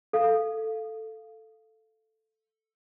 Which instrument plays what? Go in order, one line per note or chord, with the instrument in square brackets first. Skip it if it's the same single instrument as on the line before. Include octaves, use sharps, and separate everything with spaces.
[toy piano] A4 F5